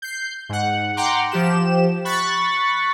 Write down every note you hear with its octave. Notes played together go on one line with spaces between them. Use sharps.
G6 C7
G#2 F#5
F#5 G5 A#5 C6 D6
F3 G4 E7
B5 C#6 F#6 A6 B6